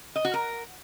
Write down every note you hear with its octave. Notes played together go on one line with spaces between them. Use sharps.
D#5
F#4
A#4